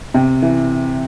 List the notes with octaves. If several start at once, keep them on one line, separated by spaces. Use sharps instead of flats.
C3
E3